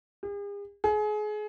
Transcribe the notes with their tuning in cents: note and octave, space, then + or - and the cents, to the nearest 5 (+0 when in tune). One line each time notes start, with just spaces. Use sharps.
G#4 -45
G#4 +30